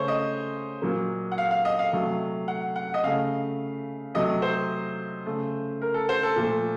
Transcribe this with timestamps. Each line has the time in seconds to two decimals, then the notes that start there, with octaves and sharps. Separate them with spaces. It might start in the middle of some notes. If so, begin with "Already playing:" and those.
Already playing: C#3 A3 C5 C#5
0.08 D#5
0.82 A#2 F#3 A#3
1.32 F#5
1.38 F5
1.51 F5
1.65 D#5
1.79 F5
1.93 C3 F#3 A3
2.48 F#5
2.76 F#5
2.94 D#5
3.04 C#3 A3 F5
4.15 C3 F#3 A3 D#5
4.42 C5
5.26 C#3 A3
5.82 A#4
5.94 A4
6.09 C5
6.23 A4
6.36 A#2 F3 A3